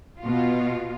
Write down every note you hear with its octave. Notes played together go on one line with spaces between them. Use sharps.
B2 F4